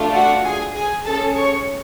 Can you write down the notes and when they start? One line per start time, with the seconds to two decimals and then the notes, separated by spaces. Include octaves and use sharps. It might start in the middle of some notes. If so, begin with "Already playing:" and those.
Already playing: A3 D4 F4 A4
0.15 F#4 F#5
0.45 G#4 G#5
0.75 G#4 G#5
1.05 C#4 G#4 A4 A5
1.35 C#5 C#6